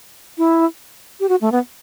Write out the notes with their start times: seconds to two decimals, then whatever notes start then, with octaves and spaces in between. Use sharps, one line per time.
0.38 E4
1.20 G4
1.29 F#4
1.41 A3
1.52 B3